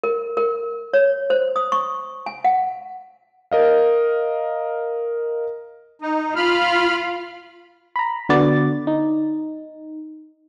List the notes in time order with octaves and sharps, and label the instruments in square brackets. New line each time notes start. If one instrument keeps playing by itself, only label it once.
[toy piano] A#4
A#4
C#5
C5
D#6
C#6
G#5
F#5
[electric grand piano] A#4 D#5 F5
[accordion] D#4
[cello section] F4 [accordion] B5 F6
[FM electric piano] A#5 B5
D3 B3 F#4 B4 D5 A6
D#4